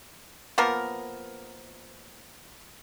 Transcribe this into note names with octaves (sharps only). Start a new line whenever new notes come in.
F3 A#3 B3 A#4